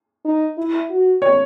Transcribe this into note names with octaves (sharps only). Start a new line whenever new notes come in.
D#4
E4
F#4
C#5